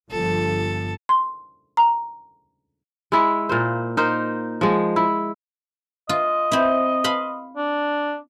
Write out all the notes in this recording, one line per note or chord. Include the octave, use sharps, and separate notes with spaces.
G1 F3 A4
C6
A#5
G#3 E4
A#2 A#3 C5
D#4 A#4 C5
F3 G#3
E4
F4 D#5
C4 E4
F5 B5 C6
D4